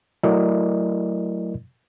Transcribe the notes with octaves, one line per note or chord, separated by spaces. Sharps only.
F#3 A3 E4 A#4 D5 D#5